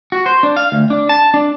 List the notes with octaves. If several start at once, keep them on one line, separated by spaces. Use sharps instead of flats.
F#4
C5
D4
F5
D2
D4
A5
D4